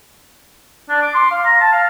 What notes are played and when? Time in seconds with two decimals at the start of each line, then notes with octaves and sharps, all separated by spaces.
0.89 D4
1.02 D6
1.14 C6
1.31 F5
1.45 A#5
1.61 A5
1.72 F5